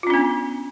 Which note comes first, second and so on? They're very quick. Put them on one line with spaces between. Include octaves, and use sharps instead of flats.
F4 C#4 D4 B3